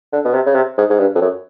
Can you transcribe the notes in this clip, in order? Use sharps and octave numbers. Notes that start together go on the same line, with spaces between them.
D3
B2
C3
C#3
C3
G#2
G#2
G2
F2
F#2